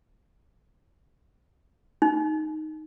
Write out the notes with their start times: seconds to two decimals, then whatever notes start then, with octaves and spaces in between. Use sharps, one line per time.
2.02 D#4